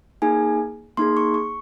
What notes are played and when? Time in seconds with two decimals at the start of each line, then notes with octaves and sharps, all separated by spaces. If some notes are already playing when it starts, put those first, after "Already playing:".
0.22 A#3 D#4 G#4 G#5
0.97 A#3 D#4 G#4 C6
1.17 C#6
1.34 C#6